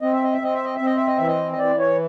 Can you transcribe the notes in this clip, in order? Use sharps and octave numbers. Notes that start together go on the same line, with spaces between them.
C4 D#5
E5
D#5
E5
C4 D#5
E5
D#5
C4 E5
D#5
E5
D#5
E3 E5
D#5
D#5
E3 D5
C#5